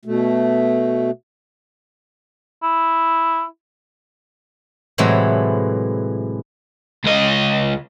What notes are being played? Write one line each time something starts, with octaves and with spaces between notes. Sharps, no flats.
B2 A3
E4
A2 C3 E3 F#3 G#3 A4
C#2 D#5